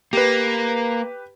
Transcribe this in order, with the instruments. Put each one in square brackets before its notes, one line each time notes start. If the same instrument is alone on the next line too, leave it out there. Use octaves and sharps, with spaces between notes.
[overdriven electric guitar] A#3 [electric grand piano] G4 B4